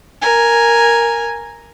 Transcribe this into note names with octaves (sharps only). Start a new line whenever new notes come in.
A#4 G#5